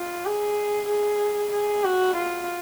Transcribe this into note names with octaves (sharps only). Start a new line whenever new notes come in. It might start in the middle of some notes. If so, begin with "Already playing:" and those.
Already playing: F4
G#4
G#4
G#4
F#4
F4